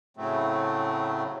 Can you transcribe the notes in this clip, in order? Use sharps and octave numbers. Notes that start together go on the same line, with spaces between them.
A2 C#3 F#3 A3 C4